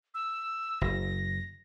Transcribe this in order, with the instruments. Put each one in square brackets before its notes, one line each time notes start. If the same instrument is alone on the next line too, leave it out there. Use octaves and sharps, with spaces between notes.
[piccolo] E6
[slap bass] F#1 [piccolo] A#6